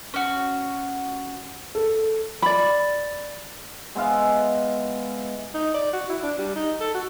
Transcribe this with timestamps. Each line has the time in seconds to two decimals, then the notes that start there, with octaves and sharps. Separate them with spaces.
0.14 C#4 F#4
1.75 A4
2.42 D5 B5
3.95 G#3 B3 E5 F5
5.54 D#4
5.75 D5
5.93 F#4
6.09 E4
6.23 D4
6.39 G3
6.56 D#4
6.81 A4
6.94 F#4